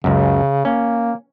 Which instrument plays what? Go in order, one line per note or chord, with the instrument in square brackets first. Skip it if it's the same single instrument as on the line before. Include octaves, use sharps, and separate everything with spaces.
[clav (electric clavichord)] C#2 F#2 [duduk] C#3
[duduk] A#3 [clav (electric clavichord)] C#4